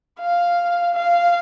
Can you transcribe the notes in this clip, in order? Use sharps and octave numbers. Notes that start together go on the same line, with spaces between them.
F5
F5